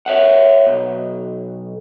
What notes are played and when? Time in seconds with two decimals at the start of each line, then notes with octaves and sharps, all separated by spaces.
0.06 C#5 E5 F#5
0.66 B1